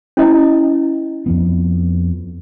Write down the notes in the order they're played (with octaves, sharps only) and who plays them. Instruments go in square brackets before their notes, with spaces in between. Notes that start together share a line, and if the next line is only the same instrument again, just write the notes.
[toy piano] C#4 E4 D#5
[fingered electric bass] F2 F3 B3